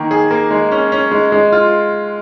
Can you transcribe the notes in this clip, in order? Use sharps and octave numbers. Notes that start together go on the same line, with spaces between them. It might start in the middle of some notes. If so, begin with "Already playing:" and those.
Already playing: D#3 A#3
G#4
A#3
G#3
C#4
C#4
G#3
G#3
F4